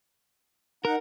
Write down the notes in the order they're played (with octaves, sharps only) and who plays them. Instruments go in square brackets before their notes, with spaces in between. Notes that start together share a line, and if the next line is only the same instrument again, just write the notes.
[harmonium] D#4 F#5 [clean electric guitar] A#4